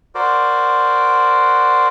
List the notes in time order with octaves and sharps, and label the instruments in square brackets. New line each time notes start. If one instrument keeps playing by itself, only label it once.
[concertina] F#4 A#4 C5 D5